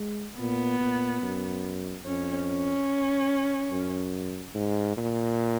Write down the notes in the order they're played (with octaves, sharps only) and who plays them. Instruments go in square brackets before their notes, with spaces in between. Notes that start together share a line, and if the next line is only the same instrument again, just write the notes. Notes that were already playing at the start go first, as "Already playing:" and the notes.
Already playing: [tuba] G#3
[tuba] A#2 [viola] B3
[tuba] A#2
F#2
[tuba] F2 [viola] C#4
[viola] C#4
[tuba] F#2
G#2
A#2